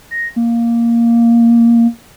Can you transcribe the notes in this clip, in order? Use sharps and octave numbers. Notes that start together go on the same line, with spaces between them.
A#6
A#3